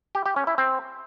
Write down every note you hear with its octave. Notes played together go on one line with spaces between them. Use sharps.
G4
G4
C#4
E4
C4